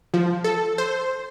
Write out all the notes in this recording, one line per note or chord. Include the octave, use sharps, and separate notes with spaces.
F3
A4
C5